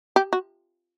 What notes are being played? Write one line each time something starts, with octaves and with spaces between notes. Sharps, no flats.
G4
F#4